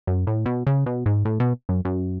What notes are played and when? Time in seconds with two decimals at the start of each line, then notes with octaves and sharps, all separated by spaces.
0.07 F#2
0.27 A2
0.46 B2
0.67 C#3
0.86 B2
1.06 G#2
1.25 A2
1.40 B2
1.69 F#2
1.85 F#2